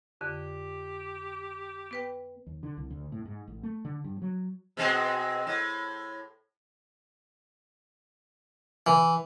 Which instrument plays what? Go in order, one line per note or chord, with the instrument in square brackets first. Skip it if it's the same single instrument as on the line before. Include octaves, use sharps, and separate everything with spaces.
[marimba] F2 D3 [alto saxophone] G4
[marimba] B3 B4 G5
[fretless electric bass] D#2
D3
C2
D2
A2
G#2
A1
A3
D3
G2
F#3
[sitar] B2 G#3 C4
A2
[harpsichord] E3